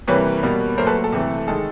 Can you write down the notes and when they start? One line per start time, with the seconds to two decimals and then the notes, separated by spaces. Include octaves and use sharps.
0.07 C3 E3 G3 A#3 B4 C#5
0.43 B2 G3 A#3
0.78 A#2 F#3 A3 A#4 C5
0.87 A4 B4
1.04 A4
1.12 C3 E3 A3
1.48 D#3 G#3 A4